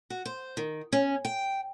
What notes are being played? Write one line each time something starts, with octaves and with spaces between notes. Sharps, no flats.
F#4
C5
D#3
C#4
G5